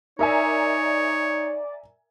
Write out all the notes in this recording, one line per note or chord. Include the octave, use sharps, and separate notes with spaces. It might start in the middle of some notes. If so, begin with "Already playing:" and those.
D#4 A#4 C#5 D5 E5 G#5